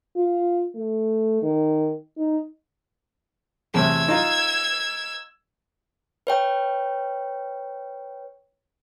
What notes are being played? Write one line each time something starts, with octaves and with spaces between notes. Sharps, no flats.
F4
A3
D#3
D#4
E2 A2 C3 E6 G#6
D#4 F4
B4 C#5 G5